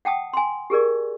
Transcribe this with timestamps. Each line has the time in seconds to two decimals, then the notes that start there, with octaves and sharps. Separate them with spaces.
0.05 F#5 G5 A5 D#6
0.33 G#5 C6
0.70 G4 G#4 A#4 D5